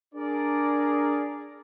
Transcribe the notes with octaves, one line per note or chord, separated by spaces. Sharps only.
D4 G#4 A#4 D5